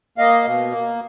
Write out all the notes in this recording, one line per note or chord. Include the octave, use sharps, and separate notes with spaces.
A#3 D#5 F5
B2
A#3